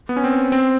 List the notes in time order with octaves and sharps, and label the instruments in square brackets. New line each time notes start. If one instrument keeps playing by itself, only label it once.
[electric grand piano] B3
C#4
C4
C4